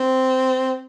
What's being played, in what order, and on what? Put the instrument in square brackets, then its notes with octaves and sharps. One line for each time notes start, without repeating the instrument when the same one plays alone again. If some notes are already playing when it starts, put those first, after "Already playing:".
Already playing: [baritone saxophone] C4